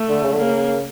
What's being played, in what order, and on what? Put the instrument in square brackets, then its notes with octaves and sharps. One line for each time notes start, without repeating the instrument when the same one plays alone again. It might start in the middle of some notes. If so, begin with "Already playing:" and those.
Already playing: [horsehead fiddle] A3
[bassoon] D3
C#3
D3
[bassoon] C#3 [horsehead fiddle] A#3